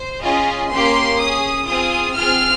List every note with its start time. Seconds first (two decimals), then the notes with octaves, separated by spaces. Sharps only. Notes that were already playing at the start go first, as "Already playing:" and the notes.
Already playing: C5
0.22 C#4 F4 G#4 D#5
0.71 A#3 C#4 G4 C6
1.19 C#4 G#4 D#6
1.68 C4 F4 G#4 D#6
2.16 C4 F4 G#4 F6